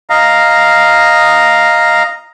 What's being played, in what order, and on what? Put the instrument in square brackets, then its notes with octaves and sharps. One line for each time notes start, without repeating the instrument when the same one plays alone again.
[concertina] D#5 F5 A#5